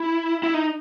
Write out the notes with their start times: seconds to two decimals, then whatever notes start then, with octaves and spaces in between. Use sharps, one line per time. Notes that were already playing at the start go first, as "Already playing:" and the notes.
Already playing: E4
0.43 E4
0.54 D#4